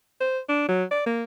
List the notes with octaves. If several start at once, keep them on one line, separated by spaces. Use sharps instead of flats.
C5
D4
F#3
D5
A#3